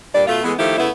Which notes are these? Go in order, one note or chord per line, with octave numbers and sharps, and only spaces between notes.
G2 A#2 G3 D5
B2 A3 F4
E3 G#3 A3 B3
D#3 F3 A3 E4 G4
C#3 A3 B3 E4